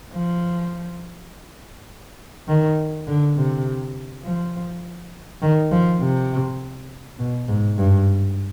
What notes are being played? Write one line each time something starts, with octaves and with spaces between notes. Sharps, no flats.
F3
D#3
D3
C3
F3
D#3
F3
C3
B2
G#2
G2